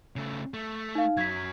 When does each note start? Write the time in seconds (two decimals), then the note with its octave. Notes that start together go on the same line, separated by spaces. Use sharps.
0.16 C#3 A3
0.54 A3
0.95 D#4 F5
1.17 F#2 F#3 G#6 B6